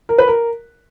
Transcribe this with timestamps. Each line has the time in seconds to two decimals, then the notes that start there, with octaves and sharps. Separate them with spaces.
0.09 A#4
0.18 B4
0.28 A#4